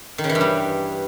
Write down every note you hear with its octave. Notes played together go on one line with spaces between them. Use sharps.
D#3
C#3
E3
G2
G3